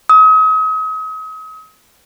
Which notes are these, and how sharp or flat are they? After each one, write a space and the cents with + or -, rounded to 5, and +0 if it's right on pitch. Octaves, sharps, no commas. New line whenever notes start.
D#6 +40